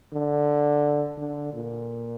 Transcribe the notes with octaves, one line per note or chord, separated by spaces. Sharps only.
D3
D3
A#2